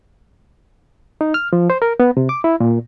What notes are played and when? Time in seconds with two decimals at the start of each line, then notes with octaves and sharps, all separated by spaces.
1.21 D#4
1.34 F6
1.53 F3
1.70 C5
1.82 A#4
2.00 B3
2.17 C3
2.29 D6
2.44 E4
2.60 A#2